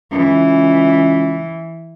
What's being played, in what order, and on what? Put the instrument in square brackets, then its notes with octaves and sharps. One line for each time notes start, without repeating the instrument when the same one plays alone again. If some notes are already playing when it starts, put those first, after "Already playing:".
[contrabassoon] C#2 [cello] E3